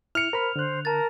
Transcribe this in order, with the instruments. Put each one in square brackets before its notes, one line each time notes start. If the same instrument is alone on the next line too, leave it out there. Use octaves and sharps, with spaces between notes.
[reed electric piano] E4 [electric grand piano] F6 C#7 [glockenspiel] F7
[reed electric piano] A#4 C5 B5
[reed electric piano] D3 F#6 [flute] C5
[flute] A#4 [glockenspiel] A5 A6